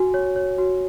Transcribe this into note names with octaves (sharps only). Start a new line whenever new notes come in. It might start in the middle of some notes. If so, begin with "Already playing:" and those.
Already playing: F#4 G#5
C#5
C#5
F#4